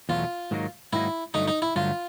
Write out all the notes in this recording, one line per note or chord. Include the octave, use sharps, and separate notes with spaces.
E2 B2 F#3 A3 F4
G#2 D#3 F#3 A#3 D#4
G#2 D#3 F#3 A#3 D#4 E4
G2 D3 F#3 A3 D#4
D#4
E4
G2 D3 F#3 A3 F4